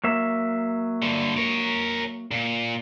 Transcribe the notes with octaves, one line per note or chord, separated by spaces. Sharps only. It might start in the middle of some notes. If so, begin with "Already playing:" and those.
F#3 A#3 E5
G2 D3
A#4 C#5
A#2